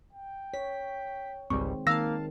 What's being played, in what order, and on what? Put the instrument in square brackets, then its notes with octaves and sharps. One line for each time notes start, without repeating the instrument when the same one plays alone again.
[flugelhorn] G5
[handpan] C#5 [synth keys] B6
[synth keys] G#1 C#2 G3 [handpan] D#3 G#3 C4 [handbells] C#6
[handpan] D#3 [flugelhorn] A#3 [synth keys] F5 A5 [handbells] E6 A#6